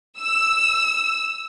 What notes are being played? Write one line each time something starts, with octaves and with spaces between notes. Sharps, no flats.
E6